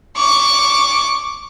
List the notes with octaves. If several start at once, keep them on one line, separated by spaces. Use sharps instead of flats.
C#6 D6